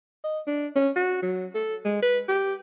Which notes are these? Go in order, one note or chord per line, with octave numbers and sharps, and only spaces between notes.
D#5
D4
C#4
F#4
F#3
A4
G#3
B4
G4